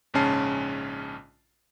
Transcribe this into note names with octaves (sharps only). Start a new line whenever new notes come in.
A#1 G#2 C#3 C#4 A5 C7